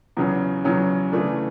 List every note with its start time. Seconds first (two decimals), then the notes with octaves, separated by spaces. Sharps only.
0.17 E2 C#3 F#3 C#4
0.64 E2 C#3 F#3 C#4
1.12 C#3 E3 A3 D4